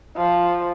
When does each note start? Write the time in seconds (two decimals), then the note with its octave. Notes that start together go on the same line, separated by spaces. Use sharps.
0.16 F3